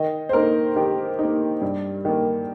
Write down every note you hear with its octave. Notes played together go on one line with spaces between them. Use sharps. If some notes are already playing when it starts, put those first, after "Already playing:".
Already playing: D#3 D#5
C5
A#3 D#4 A#4
D#3 G4
A#3 D#4
G2
D#3 A#3